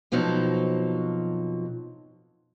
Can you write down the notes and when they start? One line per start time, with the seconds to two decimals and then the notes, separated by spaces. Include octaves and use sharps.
0.12 F2 B2 F3 F#3 D#4 A5